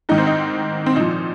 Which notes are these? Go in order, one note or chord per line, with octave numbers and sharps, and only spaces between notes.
G#2 D#3 D#4
C4
D#4
C4
A#2 F3 D#4